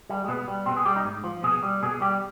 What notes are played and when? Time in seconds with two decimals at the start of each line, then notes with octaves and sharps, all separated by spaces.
0.10 G3
0.24 G#3
0.28 B2 B3
0.48 G3
0.66 B2 C4
0.77 G#4
0.85 G3 G4
0.96 D#4
1.05 G#2
1.24 F3
1.43 B2 G#4
1.63 G3
1.82 B2 G#4
2.01 G3 G4